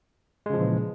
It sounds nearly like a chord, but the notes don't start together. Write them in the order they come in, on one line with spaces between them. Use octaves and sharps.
G#3 C#3 F3 A#2 E3